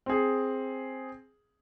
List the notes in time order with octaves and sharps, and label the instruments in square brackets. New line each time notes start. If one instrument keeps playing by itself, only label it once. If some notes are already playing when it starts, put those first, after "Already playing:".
[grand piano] C4 G#4